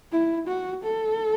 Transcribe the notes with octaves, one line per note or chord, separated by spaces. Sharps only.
E4
F#4
A4